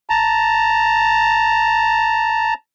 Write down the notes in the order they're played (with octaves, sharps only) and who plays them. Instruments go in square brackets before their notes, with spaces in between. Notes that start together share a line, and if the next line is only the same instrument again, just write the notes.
[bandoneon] A5 A#5